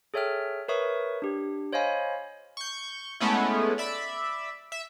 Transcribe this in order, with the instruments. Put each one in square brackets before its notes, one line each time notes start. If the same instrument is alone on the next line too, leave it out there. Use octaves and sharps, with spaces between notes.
[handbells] G#4 A4 C#5 E5 G5 F6
A#4 B4 C#5 E5 C#6 D#6
D4 G4
C5 C#5 D#5 F5 G#5 B5
[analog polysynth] C#6 G6
G#3 A3 B3 C#4 E4
D5 E5 B5
E5